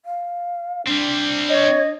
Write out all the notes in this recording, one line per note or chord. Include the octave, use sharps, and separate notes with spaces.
F5
G3 C4 D4
C#5 D#5